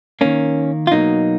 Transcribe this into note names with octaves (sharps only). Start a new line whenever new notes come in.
D#3 A#3 C#4
F4
B2 F#3 A#3 D#4